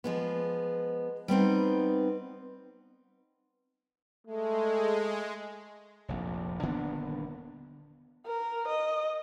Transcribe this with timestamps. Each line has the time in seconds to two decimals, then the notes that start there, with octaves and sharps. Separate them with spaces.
0.04 F3 G#3 B3
1.28 G3 B3 C4 D#4
4.27 G#3 A3
6.08 F1 A#1
6.62 D#1 D3 B3 D4
8.26 A#4
8.68 D#5